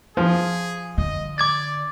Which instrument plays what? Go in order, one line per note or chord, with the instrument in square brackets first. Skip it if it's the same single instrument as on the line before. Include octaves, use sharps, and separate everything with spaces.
[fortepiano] F3 [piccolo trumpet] G#4
[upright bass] D3 [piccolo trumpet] D#5
[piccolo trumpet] D5 [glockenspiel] D6 G#6 A6